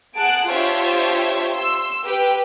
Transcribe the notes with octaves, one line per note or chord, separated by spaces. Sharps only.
G#4 F#5 A5 F#6 D7
D4 F4 G4 C5 C#5 E5
C6 E6
G4 B4 G5